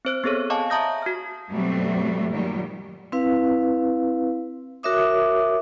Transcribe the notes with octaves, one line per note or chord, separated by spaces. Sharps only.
C4 C5 F#6
B3 C4 G#4 A4 C#5
D#5 F5 G#5 A5 C#6 D6
E5 A5 A#5 D#6 G6 A#6
F#4 F6
F#2 B2 F#3 G3 A3 C4
A#2 D#3 F#3 G3
C4 E4 B4 F5
F#4 A#4 C#5 E5 D6 D#6